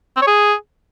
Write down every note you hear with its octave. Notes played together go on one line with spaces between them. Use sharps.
C4
C#5
G#4